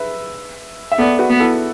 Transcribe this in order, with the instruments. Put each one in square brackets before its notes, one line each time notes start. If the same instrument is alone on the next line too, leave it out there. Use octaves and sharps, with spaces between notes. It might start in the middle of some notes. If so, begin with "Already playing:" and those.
Already playing: [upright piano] B4 E5
E5
[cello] B3 [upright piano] A4 D5
[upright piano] F#4 B4
[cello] B3
[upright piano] E4 A4